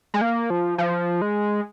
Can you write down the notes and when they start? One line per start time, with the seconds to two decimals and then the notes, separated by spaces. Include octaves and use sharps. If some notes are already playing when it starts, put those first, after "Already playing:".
0.14 G#3
0.21 A#3
0.50 F3
0.78 F3
1.22 G#3